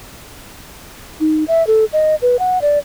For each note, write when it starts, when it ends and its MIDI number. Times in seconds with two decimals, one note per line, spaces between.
1.20 1.44 63
1.48 1.65 76
1.67 1.85 69
1.93 2.15 75
2.22 2.39 71
2.39 2.61 78
2.62 2.79 74